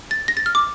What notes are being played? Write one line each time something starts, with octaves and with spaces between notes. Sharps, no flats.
A6
A#6
A6
F6
D6